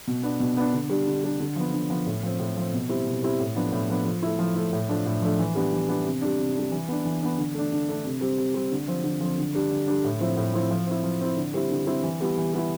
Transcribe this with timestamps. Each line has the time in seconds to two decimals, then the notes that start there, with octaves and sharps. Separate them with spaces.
0.08 B2
0.23 B3 D4
0.40 B2
0.57 B3 D4
0.73 D3
0.89 G3 D4
1.07 D3
1.24 G3 D4
1.40 D3
1.56 F3 B3
1.74 D3
1.90 F3 B3
2.06 A2
2.23 F3 C4
2.39 A2
2.57 F3 C4
2.73 B2
2.89 G3 C4 E4
3.07 B2
3.23 G3 C4 E4
3.40 A2
3.56 F3 B3 D4
3.72 A2
3.90 F3 B3 D4
4.05 F3
4.23 A3 E4
4.39 F3
4.55 A3 E4
4.73 A2
4.89 F3 A3 D4
5.06 A2
5.22 F3 A3 D4
5.39 E3
5.55 G3 B3 D4
5.71 E3
5.88 G3 B3 D4
6.05 C3
6.21 G3 D4
6.39 C3
6.55 G3 D4
6.71 E3
6.88 B3 D4
7.05 E3
7.21 B3 D4
7.38 D3
7.54 A3 D4
7.72 D3
7.89 A3 D4
8.05 C3
8.21 G3 C4
8.38 C3
8.54 G3 C4
8.72 D3
8.88 F3 C4
9.04 D3
9.20 F3 C4
9.38 D3
9.55 G3 D4
9.71 D3
9.87 G3 D4
10.05 A2
10.20 F3 C4 E4
10.37 A2
10.53 F3 C4 E4
10.70 F3
10.87 C4 E4
11.03 F3
11.21 C4 E4
11.37 D3
11.54 G3 C4 E4
11.71 D3
11.87 G3 C4 E4
12.03 E3
12.21 G3 B3 E4
12.37 E3
12.53 G3 B3 E4